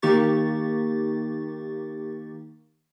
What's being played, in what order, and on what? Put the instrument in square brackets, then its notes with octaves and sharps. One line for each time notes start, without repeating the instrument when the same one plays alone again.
[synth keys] D#3 A#3 D#4 G4 C#6 A6